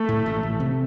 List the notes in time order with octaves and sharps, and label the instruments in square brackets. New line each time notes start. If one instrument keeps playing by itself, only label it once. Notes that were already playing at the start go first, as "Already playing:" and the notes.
Already playing: [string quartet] A3
[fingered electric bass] A2
A1
A1
C3